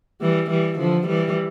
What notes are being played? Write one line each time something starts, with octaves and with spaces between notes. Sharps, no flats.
E3 G3
E3 G3
D3 F3
E3 G3